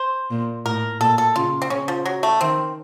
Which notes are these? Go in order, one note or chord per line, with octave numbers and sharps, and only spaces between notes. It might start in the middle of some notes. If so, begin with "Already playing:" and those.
Already playing: C5
A#2
A2 A#4
A#2 A4
A4
C#3 F4
C4
C#3 C#4
F3
F#3
A3
D#3 C4